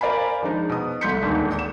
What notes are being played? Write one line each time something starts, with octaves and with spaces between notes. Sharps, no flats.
A#4 C5 D5 F5 G#5 B5
F3 G#3 D4 D#4
B2 D#6
C2 A3 C6 G6 B6 C#7
D#1 G#1 D2 G#2
E7